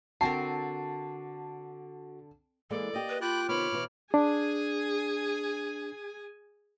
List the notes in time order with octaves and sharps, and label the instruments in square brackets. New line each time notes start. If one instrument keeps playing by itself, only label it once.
[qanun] D3 C4 A#4 [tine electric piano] F#4 C7 [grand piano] A5
[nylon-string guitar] E3 G#3 A#3 [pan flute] A4 [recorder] D5
[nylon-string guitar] A#3 G4 [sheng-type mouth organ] D#5
[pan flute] B4
[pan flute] F4 [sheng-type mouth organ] G5 D6 F#6 [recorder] B5
[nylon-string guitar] C3 D#3 B3 [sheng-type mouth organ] C#5 D6 F6 [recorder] B5
[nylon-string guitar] B2 E3
[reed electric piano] D4 [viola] G#4 G#5